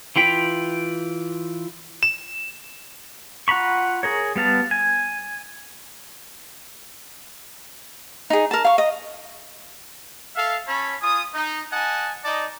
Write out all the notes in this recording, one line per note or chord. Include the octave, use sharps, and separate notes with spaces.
E3 F4 G5 B5
E7
F4 F#5 A#5 B5 C#6
G#4 A#4 C#5
G3 B3 F5 A5
G#5
D#4 G#4
A#4 A5
F5 C#6
D#5
A4 E5 F5
C#4 C#5 A5 B5
F4 G#5 D#6
D#4
D#5 F#5 G#5 A5
D#4 D5 D#5 A5